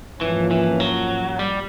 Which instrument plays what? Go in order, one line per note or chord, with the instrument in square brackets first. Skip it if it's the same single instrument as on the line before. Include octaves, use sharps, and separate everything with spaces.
[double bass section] G#2 F3 A#3 C#4 [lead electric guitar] E3
[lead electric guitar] E3
F#3
G3